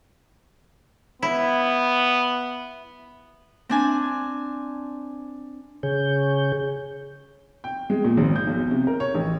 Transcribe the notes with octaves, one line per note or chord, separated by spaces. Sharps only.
B3 E4
C4 D4 G#5
C#3 G#4 C#5 G6
G5
G#3
A#2
G#1
G6
B1
C3
A#4
C#5
A1